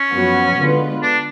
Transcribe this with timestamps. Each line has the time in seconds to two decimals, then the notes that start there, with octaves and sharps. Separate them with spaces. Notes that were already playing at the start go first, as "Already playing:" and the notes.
Already playing: C#4
0.12 F#2 F3 B3 F#4 C#5
0.58 D3 G#3 B3 F4 B4
1.02 D4